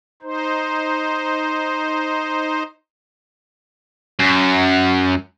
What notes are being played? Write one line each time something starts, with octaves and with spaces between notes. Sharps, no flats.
D#4 C5
F#2